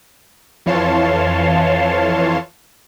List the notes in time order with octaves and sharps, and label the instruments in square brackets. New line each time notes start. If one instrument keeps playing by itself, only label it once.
[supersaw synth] F2 E3 C#5 F5 A5 C6